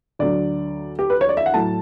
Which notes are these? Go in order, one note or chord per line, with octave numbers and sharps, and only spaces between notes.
D2 D3 F#3 D5
G4
B4
C#5
D5
E5
F#5
A2 F#3 A5